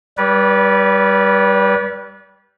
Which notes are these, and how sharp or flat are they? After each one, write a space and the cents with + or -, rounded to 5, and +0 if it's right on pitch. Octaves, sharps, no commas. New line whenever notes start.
G3 +0 B4 -25 D5 -40